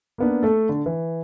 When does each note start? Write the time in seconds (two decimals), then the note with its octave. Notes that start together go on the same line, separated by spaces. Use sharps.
0.18 A#3 B3 D4
0.43 A3 A4
0.69 D3
0.86 E3